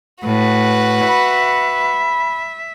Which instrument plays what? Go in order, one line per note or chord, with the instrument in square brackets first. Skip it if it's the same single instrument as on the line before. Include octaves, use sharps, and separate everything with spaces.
[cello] A2 [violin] F#4 B4
[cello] E5 [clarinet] B5